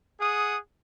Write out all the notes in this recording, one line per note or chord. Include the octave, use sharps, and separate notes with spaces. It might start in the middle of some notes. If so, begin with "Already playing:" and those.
G#4 F#5 D#6